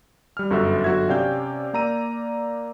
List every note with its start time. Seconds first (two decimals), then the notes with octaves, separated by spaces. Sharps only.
0.37 G3 F6
0.50 G1 F#2 F#4 A4 E5
0.84 G1 F#3 F#4 A4 E5 G#6
1.09 C3 C#4 D5 F5 G5 G6
1.73 A#3 D5 A#5 E6 D#7